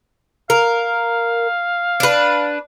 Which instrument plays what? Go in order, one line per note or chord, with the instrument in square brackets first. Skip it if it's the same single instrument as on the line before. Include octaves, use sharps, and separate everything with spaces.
[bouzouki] A#4 [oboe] F5
[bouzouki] D4 B4